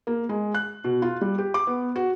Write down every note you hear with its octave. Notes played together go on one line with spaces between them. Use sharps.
A#3
G#3
F#6
B2
F4
G3
G4
D6
B3
F#4